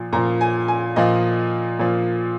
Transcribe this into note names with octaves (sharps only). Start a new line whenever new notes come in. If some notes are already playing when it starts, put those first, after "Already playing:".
Already playing: A#2 F3
A#2 F3 A#5
G#5
G#5
A#2 F3 D#5
A#2 F3